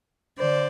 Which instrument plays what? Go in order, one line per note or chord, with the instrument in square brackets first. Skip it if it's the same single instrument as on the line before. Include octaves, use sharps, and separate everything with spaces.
[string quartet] D3 C5 D5